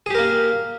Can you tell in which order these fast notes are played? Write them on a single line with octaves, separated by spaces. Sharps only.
G#4 G4 A#4 A#3